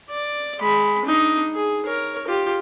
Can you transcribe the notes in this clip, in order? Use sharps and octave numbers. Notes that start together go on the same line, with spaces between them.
D5
G#3 B5
D4 D#4
G#4
A#4 C#5
F4 G4